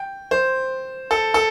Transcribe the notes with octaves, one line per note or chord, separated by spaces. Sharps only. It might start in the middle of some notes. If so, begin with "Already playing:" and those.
Already playing: G5
C5
A4
A4